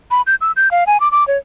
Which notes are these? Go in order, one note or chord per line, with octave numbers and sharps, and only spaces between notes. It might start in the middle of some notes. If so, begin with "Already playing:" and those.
B5
G6
E6
G6
F5
G#5
D6
D6
C#5